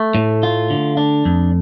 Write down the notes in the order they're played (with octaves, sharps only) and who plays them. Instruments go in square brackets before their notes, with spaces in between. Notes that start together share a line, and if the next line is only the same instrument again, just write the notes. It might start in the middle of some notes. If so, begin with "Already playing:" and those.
Already playing: [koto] A3
[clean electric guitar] A2
F4
D3
D4
F2